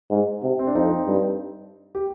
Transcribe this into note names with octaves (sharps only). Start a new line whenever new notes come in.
G#2
C3
C4
D4
F2 C4 D#4
G2
G4